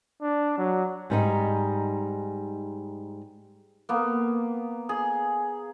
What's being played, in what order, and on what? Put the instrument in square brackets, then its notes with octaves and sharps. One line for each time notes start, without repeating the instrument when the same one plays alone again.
[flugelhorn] D4
F#3
[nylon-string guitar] G#2 G3 D#4
[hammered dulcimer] A#3 B3
G#4